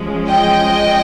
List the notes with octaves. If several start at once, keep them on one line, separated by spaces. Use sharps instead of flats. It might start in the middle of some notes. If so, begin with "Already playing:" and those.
Already playing: F3 G#3 C#4
D#5 G5